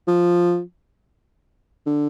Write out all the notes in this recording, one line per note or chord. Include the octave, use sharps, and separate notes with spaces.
F3
D3